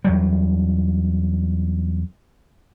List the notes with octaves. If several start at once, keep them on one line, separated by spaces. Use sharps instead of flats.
E2 F#3 G3